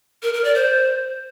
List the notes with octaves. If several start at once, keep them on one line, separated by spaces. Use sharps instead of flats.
A#4
A#4
D5
C5